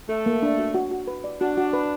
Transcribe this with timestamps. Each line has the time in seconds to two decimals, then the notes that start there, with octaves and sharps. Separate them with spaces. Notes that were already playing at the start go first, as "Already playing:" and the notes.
0.09 A3 A4
0.26 A#3
0.42 D4
0.58 F#4
0.74 F#4
0.91 F#4
1.07 B4
1.24 D5
1.41 D4 F#4
1.57 F#4
1.73 B4